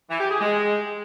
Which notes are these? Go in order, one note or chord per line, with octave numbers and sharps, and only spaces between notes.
E3
G4
G#4
G#3